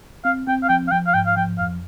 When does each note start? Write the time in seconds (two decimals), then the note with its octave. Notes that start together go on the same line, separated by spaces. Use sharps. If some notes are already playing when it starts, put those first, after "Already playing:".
0.25 C4 F5
0.47 C4 G5
0.64 F5
0.69 F3 G5
0.88 F5
0.92 F3 G5
1.07 F5
1.14 G#2 G5
1.27 F5
1.36 F3 G5
1.59 F2 F5